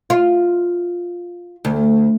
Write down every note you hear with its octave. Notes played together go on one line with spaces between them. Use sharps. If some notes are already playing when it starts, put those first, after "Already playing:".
F4
D2